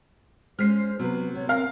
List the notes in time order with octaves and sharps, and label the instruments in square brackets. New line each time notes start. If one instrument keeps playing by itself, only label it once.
[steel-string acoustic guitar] G#3 C#4 [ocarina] C5 [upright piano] F6 C7
[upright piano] C3 [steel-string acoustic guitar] F#3 B4 [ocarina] B3
[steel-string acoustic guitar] B3 [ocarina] C#5
[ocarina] C4 [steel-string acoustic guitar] A#4 [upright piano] F5 F6